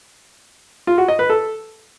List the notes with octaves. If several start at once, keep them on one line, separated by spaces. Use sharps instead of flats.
F4
F#4
D#5
B4
A4